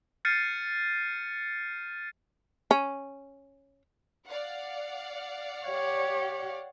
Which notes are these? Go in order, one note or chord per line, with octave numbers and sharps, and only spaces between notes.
F6 G6 A6 C7 C#7 D#7
C#4
D5 F5 F#5
G4 C#5